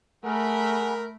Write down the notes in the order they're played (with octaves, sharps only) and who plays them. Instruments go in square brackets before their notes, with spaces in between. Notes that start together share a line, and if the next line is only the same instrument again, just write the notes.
[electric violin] A3 B5 [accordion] G#4 F#5 [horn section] A#4